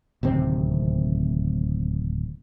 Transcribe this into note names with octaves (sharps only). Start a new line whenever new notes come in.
D1 D#2 C3 C4